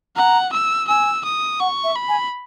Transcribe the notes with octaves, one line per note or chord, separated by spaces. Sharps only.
F#5 A#5
E6
G#5 E6
D#6
F#5 C#6
E5
B5
G#5